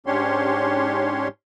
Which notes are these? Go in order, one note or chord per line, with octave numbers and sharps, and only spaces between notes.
G#2 C#4 D4 G4 C#5 C6